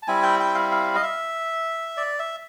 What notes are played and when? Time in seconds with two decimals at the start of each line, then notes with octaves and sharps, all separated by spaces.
0.03 A5
0.07 G3 C4 E4 G#5
0.23 G5
0.40 G5
0.54 F5
0.71 F5
0.95 D#5
1.03 E5
1.97 D5
2.19 E5